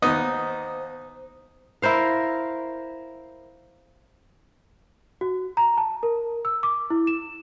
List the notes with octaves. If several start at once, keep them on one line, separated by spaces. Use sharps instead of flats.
D#2 B3 D#4 C5 D#6
E4 A#4 C5 F5
F#4
A#5
A5
A#4
E6
D6
E4
E7